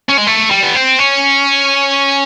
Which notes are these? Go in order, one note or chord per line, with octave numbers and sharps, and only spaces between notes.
C#4
G#3
A3
G3
B3
C4
C#4